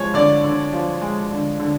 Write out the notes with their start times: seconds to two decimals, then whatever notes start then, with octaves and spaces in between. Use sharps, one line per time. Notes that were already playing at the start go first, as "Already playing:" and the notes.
Already playing: F3 G#3 C#5
0.14 D3 D5
0.44 D3
0.73 F3
1.01 G#3
1.31 D3
1.60 D3